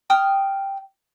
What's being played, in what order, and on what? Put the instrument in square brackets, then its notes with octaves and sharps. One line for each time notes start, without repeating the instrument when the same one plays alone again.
[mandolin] G5 D#6 F6